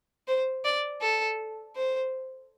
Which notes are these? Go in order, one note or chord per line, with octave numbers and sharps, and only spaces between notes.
C5
D5
A4
C5